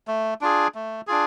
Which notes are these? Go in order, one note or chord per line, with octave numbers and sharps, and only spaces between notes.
A3
D4 F4 G#4
A3
D4 F4 G#4